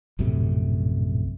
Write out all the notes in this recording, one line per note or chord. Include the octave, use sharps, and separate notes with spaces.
A#1 F#2 A2 C3